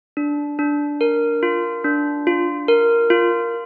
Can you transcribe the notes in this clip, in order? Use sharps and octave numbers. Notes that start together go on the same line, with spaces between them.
D4
D4
A#4
F4
D4
F4
A#4
F4